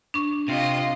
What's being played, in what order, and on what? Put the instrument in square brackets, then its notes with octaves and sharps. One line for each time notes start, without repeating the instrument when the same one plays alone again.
[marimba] D4 C#6
[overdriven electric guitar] C3 [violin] F4 D#5